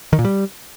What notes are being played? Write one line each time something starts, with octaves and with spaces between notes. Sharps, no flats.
D#3
A#2
G3